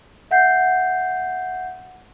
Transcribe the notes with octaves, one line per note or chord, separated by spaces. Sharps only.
E5 F#5 G6 C7